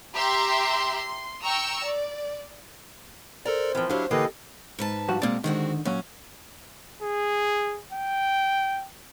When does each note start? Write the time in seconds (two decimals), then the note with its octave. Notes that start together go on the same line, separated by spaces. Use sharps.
0.14 G4 E5 A#5 C6
0.96 C6
1.43 G5 A#5 C#6 E6
1.83 D5
3.45 A4 A#4 C5 D5 A#5
3.75 E3 F3 C4 A#4
3.90 F#3 D4 E4 G4 F5
4.11 D3 E3 A#3 G4 A4 B4 D#5 C7
4.79 G#2 B4 A5
5.08 G2 F3 F#4
5.22 B2 G#3 A#3 C4 D5
5.44 D3 D#3 G#3 C4 F#4
5.85 A#2 F#3 C#4
7.03 G#4
7.93 G5